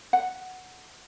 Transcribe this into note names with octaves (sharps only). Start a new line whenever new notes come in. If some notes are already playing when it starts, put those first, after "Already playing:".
F#5